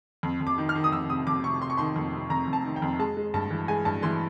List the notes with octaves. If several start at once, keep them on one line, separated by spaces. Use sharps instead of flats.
F2
F2
D6
D#3
F6
D#3
D#6
F2 E6
C3 D#6
F2 D6
C3 C#6
C3 C6
C#6
D#3 C6
F2
C3
F2 A#5
F2
A5
D#3
G5
F2
G#3 A5
G#3
G2 A5
E3
G#3 G#5
G2 A5
E3 C6